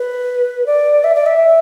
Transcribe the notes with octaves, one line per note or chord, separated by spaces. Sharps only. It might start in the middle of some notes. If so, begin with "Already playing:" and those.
Already playing: B4
D5
E5
D5
E5